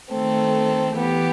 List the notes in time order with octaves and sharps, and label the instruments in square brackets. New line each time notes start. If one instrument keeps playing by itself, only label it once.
[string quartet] D#3 A3 C4 A4
E3 B3 G4